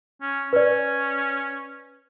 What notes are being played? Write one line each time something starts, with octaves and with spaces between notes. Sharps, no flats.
C#4
C#4 B4 D5